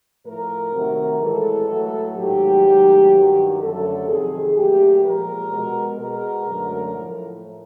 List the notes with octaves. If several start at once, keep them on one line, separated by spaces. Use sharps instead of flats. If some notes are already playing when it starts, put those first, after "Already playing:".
A2 F3 A3 A#4
C3 D#3 F#3 A3
A2 E3 G#3 A4
A2 F#3 A3
G#2 D#3 F#3 A3 G4
G#2 D#3 F#3 A3
G2 D#3 F#3
F#2 D3 F#3 A3 A4
F2 C3 D#3 G#4
A#2 F#3 A3 G4
A#2 F3 G#3 A#4
B2 G#3
B2 G#3 A#4
F#2 D3 F#3 A3
A2 F3 A3